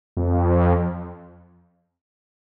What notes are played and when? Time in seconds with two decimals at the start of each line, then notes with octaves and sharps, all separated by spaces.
0.17 F2